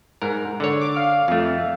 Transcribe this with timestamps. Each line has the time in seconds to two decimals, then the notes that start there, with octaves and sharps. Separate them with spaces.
0.22 G#2 A#4
0.60 D3 C#5
0.81 D6
0.96 F5
1.28 F2 A3